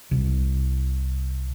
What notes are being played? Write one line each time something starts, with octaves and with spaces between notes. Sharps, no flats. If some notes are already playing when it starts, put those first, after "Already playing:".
C2